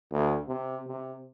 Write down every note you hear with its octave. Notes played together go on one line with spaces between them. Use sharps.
D2
C3
C3